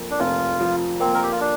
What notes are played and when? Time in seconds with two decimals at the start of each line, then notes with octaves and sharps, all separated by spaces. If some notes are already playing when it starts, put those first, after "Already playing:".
Already playing: F2 A#3
0.11 D4
0.20 F1 F4
0.60 F3
1.00 A#3 C4
1.15 A#4
1.23 G4
1.32 F4
1.40 D4